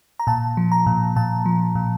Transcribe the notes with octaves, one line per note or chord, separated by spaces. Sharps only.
A#5
A#2 A5
F3
A#5
A#2
A#2 A5
F3
A#2